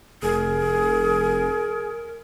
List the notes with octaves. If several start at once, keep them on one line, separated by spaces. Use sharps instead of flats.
F1 G#4 A#4